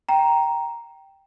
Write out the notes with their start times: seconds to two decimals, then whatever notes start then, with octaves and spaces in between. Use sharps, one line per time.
0.09 G5 A#5